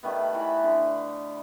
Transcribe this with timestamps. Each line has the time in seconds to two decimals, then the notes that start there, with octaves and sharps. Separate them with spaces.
0.03 D#3 G3 A3 B3
0.34 E3 B5
0.64 D3